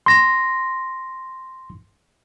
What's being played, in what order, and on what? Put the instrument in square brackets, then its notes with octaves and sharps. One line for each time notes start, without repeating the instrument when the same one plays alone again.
[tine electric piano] C6 A#6